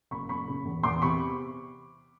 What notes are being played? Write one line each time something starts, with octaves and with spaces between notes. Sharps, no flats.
F#1 B5 C#6
F#1 B5 C#6
C#3
E2
E2 C6 D6
C3 B5 C#6